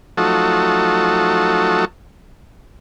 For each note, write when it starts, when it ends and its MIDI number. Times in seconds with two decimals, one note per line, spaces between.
0.17 1.85 53
0.17 1.85 54
0.17 1.85 57
0.17 1.85 63
0.17 1.85 66
0.17 1.85 69